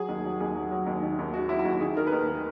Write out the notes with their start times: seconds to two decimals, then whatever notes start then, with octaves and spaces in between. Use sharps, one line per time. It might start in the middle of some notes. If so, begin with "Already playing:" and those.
Already playing: F#3 G#4
0.08 D#2
0.24 F#3
0.40 D#2 G#4
0.55 F#3
0.71 F#3
0.86 D#2
1.02 D#3
1.19 D#2
1.34 D#3 F#4
1.49 F#3 E4
1.59 E4
1.65 D#2 F#4
1.81 D#3 G#4
1.97 D#3 A#4
2.07 B4
2.12 D#2 A#4